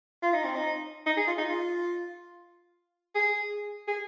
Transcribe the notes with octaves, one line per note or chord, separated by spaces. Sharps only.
F4
D#4
C4
D#4
D#4
G#4
F4
D#4
F4
G#4
G#4